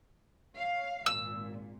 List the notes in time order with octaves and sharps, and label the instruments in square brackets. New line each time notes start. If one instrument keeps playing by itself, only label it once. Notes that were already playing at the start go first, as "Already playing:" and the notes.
[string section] C#5 F5
[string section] G#1 A#2 [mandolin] E6